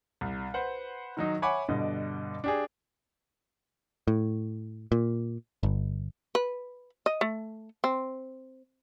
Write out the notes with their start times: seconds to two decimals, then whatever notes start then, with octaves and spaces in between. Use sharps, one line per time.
0.21 C2
0.54 B4 C5 F#5
1.17 D#3 F#3 D#4
1.42 C#5 E5 F#5 G#5 B5 D6
1.68 G2 B2 D3 D#5
2.44 D4 G4 G#4
4.08 A2
4.92 A#2
5.63 G1
6.35 B4
7.06 D#5
7.21 A3
7.84 C4